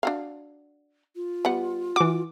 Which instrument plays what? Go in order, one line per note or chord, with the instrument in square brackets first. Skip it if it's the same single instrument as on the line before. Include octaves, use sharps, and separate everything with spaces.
[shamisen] D4 F#4 F5
[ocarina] F4
[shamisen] G3 B3 F#5
[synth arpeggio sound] E3 D6 [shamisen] F#4